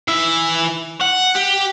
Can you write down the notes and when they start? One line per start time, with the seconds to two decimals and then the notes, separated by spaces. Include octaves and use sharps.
0.08 E3 E5
1.01 F#5
1.35 G4